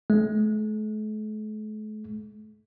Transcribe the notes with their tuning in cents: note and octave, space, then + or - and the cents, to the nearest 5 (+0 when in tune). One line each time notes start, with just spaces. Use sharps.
A3 -45